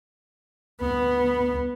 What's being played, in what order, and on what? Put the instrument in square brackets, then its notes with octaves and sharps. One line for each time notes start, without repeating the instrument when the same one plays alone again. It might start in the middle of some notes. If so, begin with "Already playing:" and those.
[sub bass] D2 [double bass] B3